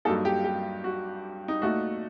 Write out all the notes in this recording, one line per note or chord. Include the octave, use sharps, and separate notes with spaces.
G2 F#3 A#3 D#4 A4
G4
G4
F#4
D#4
A#2 A3 D#4 F#4